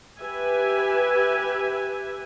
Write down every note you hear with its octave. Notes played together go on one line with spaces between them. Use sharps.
G4 B4 E5 G#5